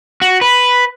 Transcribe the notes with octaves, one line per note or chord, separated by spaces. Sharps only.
F#4
B4